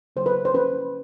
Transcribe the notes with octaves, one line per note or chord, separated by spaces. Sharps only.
C#3 F#3 A#3 C5
B4
C5
F3 A#3 C#4 B4